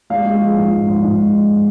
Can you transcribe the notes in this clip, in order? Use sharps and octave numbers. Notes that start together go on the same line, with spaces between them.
G#3 F5
G#3
F3
G#2
F3
G#2
G#2